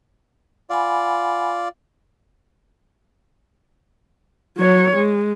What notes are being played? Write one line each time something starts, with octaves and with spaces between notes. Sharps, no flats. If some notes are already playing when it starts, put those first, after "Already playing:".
F4 D5 F#5 G#5 B5
F#3 C#5
G#3